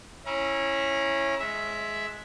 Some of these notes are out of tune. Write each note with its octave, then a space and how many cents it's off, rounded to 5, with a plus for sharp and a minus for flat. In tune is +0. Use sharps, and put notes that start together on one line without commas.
C#4 -15 E4 +0 A#5 +35
G#3 +15 E5 +0